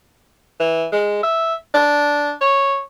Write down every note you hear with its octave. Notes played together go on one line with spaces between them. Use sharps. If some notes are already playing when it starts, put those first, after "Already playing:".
E3
G#3
E5
D4
C#5